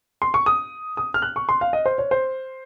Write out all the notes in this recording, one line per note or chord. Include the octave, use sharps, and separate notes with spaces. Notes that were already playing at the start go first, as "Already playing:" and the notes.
C6
C#6
D#6
D#6
F6
F#6
C#6
C6
F5
D#5
C5
C#5
C5